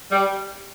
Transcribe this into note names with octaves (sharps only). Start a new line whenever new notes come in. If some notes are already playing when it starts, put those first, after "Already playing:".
G3